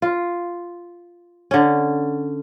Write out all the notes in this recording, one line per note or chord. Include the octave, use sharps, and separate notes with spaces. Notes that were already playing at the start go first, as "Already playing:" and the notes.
F4
D3 C#4